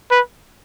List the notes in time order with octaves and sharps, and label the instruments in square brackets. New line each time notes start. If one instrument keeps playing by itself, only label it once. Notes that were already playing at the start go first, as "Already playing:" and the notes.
[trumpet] B4